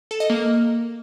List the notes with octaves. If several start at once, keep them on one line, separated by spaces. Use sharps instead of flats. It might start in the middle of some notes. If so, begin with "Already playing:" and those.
A4
D#5
A#3